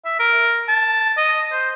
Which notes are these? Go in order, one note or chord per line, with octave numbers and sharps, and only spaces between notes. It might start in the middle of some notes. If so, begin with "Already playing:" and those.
E5
A#4
A5
D#5
C5